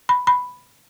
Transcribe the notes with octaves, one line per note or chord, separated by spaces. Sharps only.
B5
B5